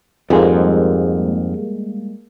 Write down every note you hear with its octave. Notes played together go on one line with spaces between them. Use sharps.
F2 G#2 G3 G#3 A#3